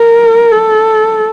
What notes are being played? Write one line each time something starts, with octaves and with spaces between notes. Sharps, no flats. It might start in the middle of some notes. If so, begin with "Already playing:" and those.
Already playing: A#4
A4